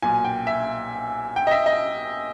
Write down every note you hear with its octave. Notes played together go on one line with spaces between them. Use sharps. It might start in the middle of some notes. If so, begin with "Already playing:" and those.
B1 A#2 G#5
G5
E5
G5
D#5
E5
D#5